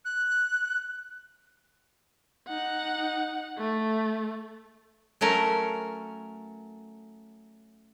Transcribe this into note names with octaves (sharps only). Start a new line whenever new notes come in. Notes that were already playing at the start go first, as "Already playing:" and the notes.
F#6
D#4 F#5
A3
F#3 A3 C#4 A#4